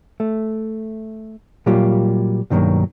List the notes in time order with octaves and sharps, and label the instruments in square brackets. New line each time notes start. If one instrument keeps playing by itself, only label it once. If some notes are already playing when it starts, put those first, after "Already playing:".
[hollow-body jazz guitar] A3
A#2 F#3 G3 A#3 F4 G4
B1 G2 D#3 F#3 A#3